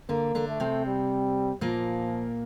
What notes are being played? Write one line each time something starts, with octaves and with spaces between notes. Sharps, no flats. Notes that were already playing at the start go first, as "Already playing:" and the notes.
D3 A#3 D4
D3 D4
A3
C3 C4
G3
A#2 F3 A#3